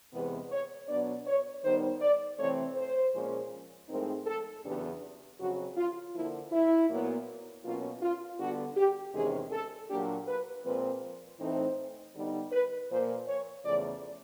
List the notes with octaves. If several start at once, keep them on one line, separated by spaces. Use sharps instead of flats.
E2 C3 E3 G#3 B3 B4
C#5
B2 F#3 B3 D4 D5
C#5
D#3 G3 B3 D#4 C5
D5
C3 E3 A3 C4 C#5
C5
A#2 F3 G#3 C#4
A2 F3 G#3 C4 D#4 A#4
A4
E2 C#3 F#3 B3 D4 G4
F2 C#3 F#3 F#4
F4
D3 F3 A#3 E4
E4
A#2 F#3 B3
B2 F#3 A#3 C#4 F4
F4
D3 G3 B3 D4 F#4
G4
E2 C3 D#3 G#3 C#4 G#4
A4
A#2 F#3 A#3 D4 G4
B4
A#2 F3 G#3 C4 B4
A2 E3 A3 C4 D#4 C5
D3 G3 B3 D#4
B4
A#2 F3 A#3 C5
C#5
E2 C#3 F3 A3 D5